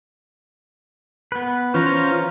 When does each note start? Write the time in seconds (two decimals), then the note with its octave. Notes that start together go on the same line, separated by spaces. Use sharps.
1.32 B3 B4
1.74 E3 C#4 F4 C5 A#5